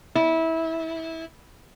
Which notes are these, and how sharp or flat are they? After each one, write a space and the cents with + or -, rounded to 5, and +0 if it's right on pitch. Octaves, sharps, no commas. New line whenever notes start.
E4 -20